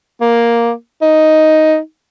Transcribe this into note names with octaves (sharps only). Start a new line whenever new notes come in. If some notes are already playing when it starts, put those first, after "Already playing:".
A#3
D#4